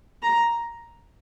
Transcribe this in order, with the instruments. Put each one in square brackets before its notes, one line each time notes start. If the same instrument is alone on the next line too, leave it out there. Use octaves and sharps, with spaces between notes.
[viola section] A#5